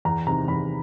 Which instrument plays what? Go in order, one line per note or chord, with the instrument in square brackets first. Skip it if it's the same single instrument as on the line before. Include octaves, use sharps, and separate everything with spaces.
[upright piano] E2 A#5
C3 D#3 A#5
E2 B5